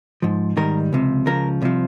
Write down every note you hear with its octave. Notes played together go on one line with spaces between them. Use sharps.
G#2 F3
G#2 D#3 G3 A#4
C#2 C3 F3
C#2 C#3 F3 A#4
C2 C3 F3